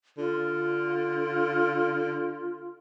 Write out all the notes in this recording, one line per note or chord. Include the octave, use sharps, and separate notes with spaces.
D3 F4